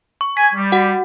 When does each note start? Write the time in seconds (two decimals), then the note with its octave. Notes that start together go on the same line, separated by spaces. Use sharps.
0.21 C#6
0.37 G#5 B6
0.53 G3
0.72 F#4 F#5